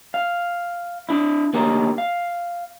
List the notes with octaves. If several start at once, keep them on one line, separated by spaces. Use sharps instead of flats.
F5
D4 E4
D2 D3 A#3 G4 A#4
F5